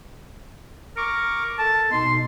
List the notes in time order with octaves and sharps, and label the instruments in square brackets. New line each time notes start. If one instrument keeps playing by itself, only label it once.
[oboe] A#4 [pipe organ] C#6 D6
[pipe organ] A4 [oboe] A5
[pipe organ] B2 D#4 [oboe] C6